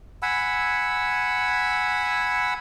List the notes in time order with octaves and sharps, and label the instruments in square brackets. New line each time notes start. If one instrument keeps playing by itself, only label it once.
[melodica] F#5 G#5 B5 E6